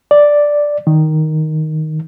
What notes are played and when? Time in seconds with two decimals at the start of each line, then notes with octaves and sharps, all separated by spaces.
0.11 D5
0.87 D#3